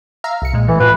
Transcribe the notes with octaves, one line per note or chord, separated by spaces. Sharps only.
E5 F5 A#5
C2 C#7
A#2 G#3
E3 A3
A2 F4 B4